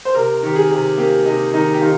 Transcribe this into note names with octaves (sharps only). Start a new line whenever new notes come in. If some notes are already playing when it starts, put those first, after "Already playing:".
C5
C3 A#4
D#3 G4
G#4
C3
A#3 G4
C3 D#4
D#3 D#4
G4
D#3 F4